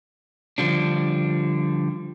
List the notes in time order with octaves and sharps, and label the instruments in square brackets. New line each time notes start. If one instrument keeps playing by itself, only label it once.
[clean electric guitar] D3 F3 G3 D4